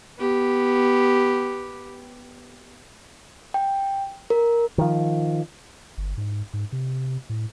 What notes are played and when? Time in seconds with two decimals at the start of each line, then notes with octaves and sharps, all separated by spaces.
0.19 B3 G4
3.54 G5
4.30 A#4
4.78 D#3 F3
5.97 G1
6.17 G#2
6.53 G#2
6.72 C3
7.29 A2